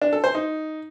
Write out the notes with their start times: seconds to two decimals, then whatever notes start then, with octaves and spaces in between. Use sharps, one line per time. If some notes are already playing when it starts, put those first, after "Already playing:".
0.02 D4
0.13 A4
0.24 C5
0.35 D#4